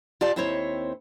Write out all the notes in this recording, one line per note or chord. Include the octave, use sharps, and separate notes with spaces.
F4 G4 D5 F5 A5
D#2 C4 E4 C5 C#5